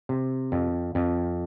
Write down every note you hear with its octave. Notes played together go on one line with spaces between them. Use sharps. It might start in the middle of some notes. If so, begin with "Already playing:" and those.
C3
F2
F2